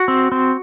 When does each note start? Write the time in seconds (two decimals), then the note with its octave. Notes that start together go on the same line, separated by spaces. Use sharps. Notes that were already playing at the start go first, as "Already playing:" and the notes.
Already playing: F#4
0.08 C4
0.32 C4